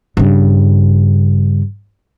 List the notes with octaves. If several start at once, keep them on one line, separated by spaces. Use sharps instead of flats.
G2 C#3